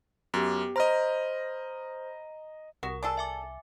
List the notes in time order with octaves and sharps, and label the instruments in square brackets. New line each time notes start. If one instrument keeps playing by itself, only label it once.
[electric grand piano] F#2 [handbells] B3 G4
[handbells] C5 B5 F6 [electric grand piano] D#5 A#5
[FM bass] C2 [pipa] F#4 [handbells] A#4
[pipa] D4 G#4 A4
[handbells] E5 G#5 D6